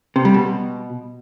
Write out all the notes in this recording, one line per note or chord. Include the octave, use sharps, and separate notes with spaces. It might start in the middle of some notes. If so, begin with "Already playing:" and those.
C3
G3
B2